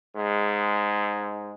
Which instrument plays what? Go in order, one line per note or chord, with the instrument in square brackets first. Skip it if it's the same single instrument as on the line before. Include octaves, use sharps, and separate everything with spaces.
[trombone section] G#2 G#3